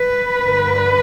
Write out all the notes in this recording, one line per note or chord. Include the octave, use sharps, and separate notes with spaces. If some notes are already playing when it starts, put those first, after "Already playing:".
Already playing: B4
G2 D3